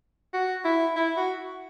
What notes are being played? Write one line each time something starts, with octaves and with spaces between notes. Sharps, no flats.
F#4
E4
E4
F#4